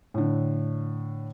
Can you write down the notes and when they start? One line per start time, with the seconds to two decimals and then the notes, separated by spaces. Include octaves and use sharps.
0.14 A2 D3